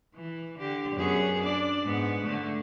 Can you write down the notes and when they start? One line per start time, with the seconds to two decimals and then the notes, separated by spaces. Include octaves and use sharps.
0.14 E3
0.58 D3 G4
0.96 F#2 B3 G#4
1.40 D4 D5
1.84 G#2 B3
2.24 D3 A3